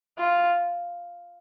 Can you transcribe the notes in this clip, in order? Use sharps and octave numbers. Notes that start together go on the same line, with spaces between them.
F4